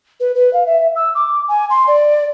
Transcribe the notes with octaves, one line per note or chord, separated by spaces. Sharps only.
B4
B4
F5
E5
E6
D6
G#5
C6
D5